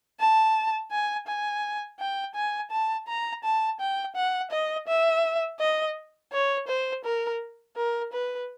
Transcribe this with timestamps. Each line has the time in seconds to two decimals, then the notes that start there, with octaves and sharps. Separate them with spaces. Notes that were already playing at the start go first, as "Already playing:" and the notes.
0.20 A5
0.91 G#5
1.27 G#5
1.99 G5
2.35 G#5
2.71 A5
3.08 A#5
3.44 A5
3.80 G5
4.16 F#5
4.51 D#5
4.87 E5
5.59 D#5
6.33 C#5
6.67 C5
7.04 A#4
7.76 A#4
8.13 B4